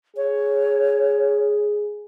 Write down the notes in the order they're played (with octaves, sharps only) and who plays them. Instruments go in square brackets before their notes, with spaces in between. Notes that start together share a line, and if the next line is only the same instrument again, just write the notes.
[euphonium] G#4 [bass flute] C#5